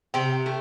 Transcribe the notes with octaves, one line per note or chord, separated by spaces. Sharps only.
C3 G5
A3